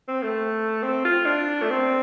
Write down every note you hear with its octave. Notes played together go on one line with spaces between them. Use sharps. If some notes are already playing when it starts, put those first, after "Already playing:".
C4
A3
C4
F4
D4
A3
C4